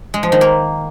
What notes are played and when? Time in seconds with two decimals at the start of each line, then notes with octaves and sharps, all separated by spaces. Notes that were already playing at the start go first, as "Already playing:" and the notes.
0.14 G#3
0.23 F3
0.32 D#3
0.41 A#3